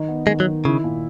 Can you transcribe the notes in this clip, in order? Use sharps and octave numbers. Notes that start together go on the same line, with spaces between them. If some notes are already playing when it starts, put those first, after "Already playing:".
Already playing: D#3 D#4
B3
D#3 G#3
F#3
D#3
C#3 E4
A#2